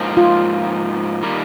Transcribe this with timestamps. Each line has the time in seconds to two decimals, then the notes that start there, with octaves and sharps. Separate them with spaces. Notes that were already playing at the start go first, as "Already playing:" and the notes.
Already playing: G#2 F3 A#3
0.17 F4
1.22 D#3 G3 A#3